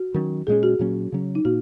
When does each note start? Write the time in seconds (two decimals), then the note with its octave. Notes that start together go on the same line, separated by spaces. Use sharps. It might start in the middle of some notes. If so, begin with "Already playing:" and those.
Already playing: F#4
0.14 D#3 F#3 C#4
0.47 A#2 G#3 C#4 G#4
0.63 F#4
0.79 A#2 F#3 A#3 C#4
1.12 C#3 F#3 C#4
1.35 D#4
1.45 A#2 A#3 F#4